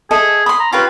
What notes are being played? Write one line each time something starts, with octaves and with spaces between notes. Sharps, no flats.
G#4 A4 D#5 E5
B5 C6 D#6
A#5
C#4 F4 G4 B4